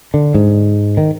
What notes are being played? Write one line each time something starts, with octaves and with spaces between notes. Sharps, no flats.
D3
G#2
D#3